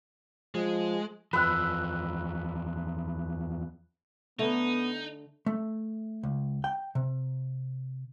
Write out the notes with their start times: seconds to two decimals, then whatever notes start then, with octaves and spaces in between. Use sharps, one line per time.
0.55 F3 G#3
1.33 E2 F3 B4 B5 E6 F#6
4.39 D3 A3 B3 D#4
5.46 A3
6.23 C#2
6.64 G5
6.95 C3